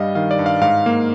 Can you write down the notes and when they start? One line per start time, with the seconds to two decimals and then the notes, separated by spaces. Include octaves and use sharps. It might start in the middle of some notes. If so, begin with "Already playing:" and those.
Already playing: G2 G3 D#5 F5
0.15 D#3 F5
0.31 D5
0.39 G2
0.46 F5
0.61 G#2 F5
0.86 A#3